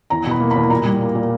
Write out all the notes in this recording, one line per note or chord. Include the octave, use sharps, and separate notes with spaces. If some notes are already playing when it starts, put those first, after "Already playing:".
E2 A#5
B2 B5
A#3
E2 B5
A#2 A#5
G3
A#3
A#2